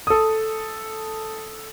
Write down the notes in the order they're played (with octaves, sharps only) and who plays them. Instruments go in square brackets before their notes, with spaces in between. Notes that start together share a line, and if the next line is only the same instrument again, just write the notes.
[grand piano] A4 D#6